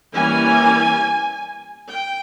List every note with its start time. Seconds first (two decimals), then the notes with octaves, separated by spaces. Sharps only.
0.14 E3 G3 A#3 C#4 G#5
1.91 G5